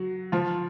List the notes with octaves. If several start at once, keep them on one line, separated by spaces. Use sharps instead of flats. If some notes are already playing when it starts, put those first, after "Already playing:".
Already playing: F#3 F#4
F3 F4